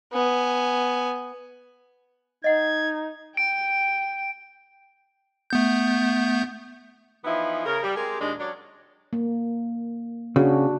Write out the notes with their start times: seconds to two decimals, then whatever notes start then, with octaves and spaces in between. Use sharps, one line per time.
0.12 B3 G#5
2.44 D#4 D#5 F#5 G#6
3.37 G5 D7
5.50 A3 B3 G6
7.25 E3 F3 B3 D#4 E4
7.65 C#3 A#4
7.83 G3
7.96 G#3 C4 G4 G#4 A#4
8.20 D#2 A#2 G#3 D4
8.39 F#3 C#4 D4 C#5 D5
9.13 A#3
10.36 C#3 D4 F#4